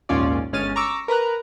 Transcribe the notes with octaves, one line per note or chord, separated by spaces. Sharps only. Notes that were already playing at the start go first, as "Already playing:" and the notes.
A#1 D#2 G#2 C#4 F4 D5
G1 G#3 C#4 F6 A6 D#7
A#5 C#6 D6 E6
A#4 B4 A#5 F#6